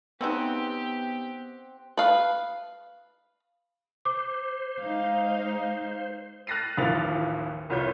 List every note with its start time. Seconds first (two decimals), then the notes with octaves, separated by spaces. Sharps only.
0.21 C#3 A3 B3 C4 D#4 G4 F#5 G5
1.97 B4 F5
4.05 C5 D6
4.82 G#3 D#4 F5
6.47 F6 F#6 A6 A#6 C7 D#7
6.77 A1 D#2 E3 F3 A6 F7
7.69 F1 C2 F4 C#5 G6